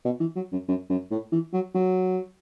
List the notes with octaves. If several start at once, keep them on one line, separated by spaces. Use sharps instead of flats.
B2
E3
F#3
F#2
F#2
F#2
A2
E3
F#3
F#3